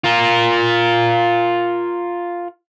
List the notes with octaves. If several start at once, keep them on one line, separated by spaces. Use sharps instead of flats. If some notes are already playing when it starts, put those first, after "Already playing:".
F4 A#4